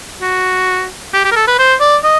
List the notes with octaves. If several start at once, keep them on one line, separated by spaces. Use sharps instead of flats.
F#4
G4
G4
A#4
A4
B4
C5
D5
D#5